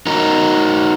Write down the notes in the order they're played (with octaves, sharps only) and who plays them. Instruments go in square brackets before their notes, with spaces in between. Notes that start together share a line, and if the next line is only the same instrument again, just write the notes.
[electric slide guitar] D#4 F#4 A#4